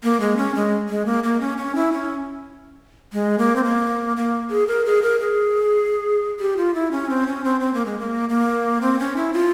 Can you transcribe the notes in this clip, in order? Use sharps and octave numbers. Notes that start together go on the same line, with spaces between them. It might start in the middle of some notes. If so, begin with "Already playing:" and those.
A#3
G#3
C#4
G#3
G#3
A#3
A#3
C#4
C#4
E4
C#4
G#3
A#3
C4
A#3
A#3
G#4
A#4
G#4
A#4
G#4
G4
F4
E4
C#4
C4
C#4
C4
C4
A#3
G#3
A#3
A#3
C4
C#4
E4
F4